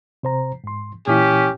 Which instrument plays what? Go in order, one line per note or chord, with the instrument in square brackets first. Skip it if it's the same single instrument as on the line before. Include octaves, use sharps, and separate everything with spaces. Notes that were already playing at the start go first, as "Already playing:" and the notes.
[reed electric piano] C3 C5 A#5
G#2 C6
[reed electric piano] A#2 E3 E4 [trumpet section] C#4 G4